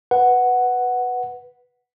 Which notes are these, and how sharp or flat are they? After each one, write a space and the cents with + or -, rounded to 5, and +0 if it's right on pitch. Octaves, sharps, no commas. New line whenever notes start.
B4 +0 F#5 +0